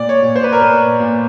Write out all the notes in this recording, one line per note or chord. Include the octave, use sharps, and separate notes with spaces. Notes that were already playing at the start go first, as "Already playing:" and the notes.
Already playing: A#2 D5
C#5
A#2
C5
B4
A#4
A#2 B4
A#2